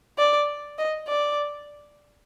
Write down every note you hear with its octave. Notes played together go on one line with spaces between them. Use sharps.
D5
D#5
D5